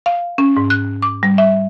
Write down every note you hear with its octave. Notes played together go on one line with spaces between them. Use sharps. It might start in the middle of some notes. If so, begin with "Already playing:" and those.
F5
C#4
G#2
F#6
D6
G3
E5